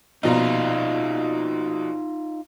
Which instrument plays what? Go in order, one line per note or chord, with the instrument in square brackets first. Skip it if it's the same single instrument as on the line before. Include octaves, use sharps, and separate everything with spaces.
[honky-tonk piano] A#1 B2 A#5 [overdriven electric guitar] D#4 F4